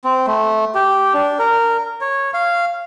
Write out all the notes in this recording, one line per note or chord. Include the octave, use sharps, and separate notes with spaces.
C4
A3
G4
D4
A#4
C#5
F5